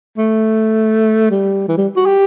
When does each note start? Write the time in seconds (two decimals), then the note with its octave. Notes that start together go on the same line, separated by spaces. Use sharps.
0.18 A3
1.31 G3
1.69 E3
1.78 G3
1.96 F#4
2.06 G4